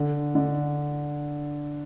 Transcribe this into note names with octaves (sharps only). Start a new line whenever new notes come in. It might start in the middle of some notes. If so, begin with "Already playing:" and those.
Already playing: D3
D3